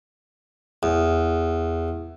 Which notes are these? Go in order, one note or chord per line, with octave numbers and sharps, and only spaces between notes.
E2